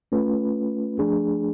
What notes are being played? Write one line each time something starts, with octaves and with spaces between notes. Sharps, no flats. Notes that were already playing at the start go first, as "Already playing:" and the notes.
A3 C#4 F4 B4
F3 A3 D4 G#4